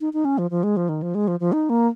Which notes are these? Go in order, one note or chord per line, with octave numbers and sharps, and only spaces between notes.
D#4
D#4
C#4
F3
F3
G#3
F3
D#3
F3
G#3
F3
F3
D#4
A#3